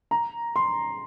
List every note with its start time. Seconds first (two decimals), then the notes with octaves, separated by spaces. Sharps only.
0.11 A#5
0.56 C6